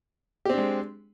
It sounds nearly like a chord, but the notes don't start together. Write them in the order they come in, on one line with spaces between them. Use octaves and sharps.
G4 C4 D4 G#3